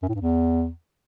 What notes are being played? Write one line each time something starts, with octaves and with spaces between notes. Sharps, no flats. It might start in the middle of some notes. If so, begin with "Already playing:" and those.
F#2
A2
G2
E2